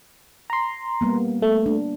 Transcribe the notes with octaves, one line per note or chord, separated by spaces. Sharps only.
A#5 C6
G3 A#3 B3
A3
D4